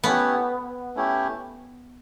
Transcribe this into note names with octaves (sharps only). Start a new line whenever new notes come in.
A3 B3 C#4 E4 G4
A3 C#4 E4 G4